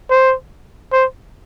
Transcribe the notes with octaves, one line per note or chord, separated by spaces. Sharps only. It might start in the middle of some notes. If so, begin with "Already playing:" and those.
C5
C5